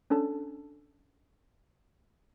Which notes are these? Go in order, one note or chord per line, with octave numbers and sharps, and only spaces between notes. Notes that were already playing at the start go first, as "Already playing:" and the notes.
C#4 D4 A4 A5